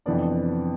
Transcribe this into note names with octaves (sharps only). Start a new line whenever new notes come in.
F2 C3 E3 B3 D4 D5